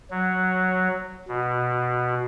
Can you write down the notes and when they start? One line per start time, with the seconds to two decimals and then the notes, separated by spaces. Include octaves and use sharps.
0.11 F#3
1.28 B2